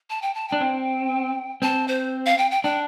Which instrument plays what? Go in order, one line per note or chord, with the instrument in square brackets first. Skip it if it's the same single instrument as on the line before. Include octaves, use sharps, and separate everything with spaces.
[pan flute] A5
G5
A5
[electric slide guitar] D4 [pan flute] G5
[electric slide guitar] C4
[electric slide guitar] C4 [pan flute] A5
[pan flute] C5
F5
G5
G5
[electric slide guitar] D4 [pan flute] G5